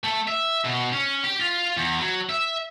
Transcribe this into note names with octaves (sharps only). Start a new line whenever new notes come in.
A3
E5
B2
C#4
G4
F4
E2
F#3
E5